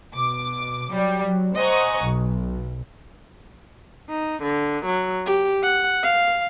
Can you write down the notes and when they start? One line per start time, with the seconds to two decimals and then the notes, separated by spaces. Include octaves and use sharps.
0.11 B2 D6
0.90 F#3 G3
1.24 F#3
1.56 C5 D#5 F#5 G#5 A#5 C#6
2.01 B1
4.09 D#4
4.43 D3
4.86 F#3
5.26 G4
5.63 F#5
6.03 F5